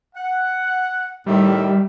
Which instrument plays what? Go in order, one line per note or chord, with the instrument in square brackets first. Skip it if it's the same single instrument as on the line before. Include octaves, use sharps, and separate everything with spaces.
[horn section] F#5
[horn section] A2 D#3 E5 [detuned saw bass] G3